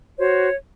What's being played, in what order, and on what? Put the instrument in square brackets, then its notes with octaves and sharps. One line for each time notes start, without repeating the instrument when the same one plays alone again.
[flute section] F#4 C5 C#5